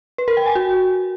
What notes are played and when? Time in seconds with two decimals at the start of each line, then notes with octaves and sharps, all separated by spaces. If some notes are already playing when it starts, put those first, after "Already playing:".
0.18 B4
0.28 A#4
0.37 G5
0.46 G#5
0.55 F#4